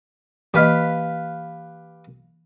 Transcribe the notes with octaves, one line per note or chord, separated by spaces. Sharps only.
E3 A#3 G4 B4 D#5 F5